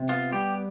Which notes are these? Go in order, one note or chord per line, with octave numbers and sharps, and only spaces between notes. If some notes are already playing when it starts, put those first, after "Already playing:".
Already playing: C3
B3 F4
G3 G4